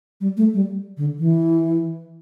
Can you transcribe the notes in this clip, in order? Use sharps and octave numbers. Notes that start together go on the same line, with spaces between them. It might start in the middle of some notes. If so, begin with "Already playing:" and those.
G3
A3
G3
D3
E3